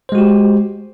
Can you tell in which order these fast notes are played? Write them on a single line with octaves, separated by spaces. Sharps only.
C5 G#3 F#4 G4